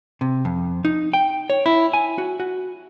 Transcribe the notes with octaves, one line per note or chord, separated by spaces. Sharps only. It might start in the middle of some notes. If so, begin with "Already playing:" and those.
C3
F2
D#4
G5
C#5
E4
G#5
F#4
F#4